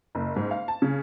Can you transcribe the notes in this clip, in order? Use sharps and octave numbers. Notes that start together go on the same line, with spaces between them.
F#1
G#2
F5
A5
C#3